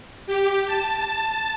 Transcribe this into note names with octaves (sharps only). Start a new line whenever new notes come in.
G4
A5